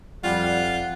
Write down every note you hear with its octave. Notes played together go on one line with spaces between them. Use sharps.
F2 G3 F4 F#5